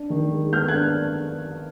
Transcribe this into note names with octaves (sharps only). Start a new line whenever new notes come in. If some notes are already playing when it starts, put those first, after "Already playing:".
Already playing: D4
D#3
G#3
B3 F6 G6
F#6 G#6
D4